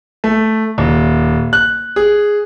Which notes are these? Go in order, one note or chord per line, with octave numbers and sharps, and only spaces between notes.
A3
D#1
F#6
G#4